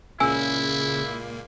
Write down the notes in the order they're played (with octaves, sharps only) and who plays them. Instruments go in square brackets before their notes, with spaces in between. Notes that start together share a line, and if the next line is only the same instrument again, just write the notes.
[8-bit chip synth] C#2 A#2 A#3 [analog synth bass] C#3 [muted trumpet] E4 [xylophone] G#5 E6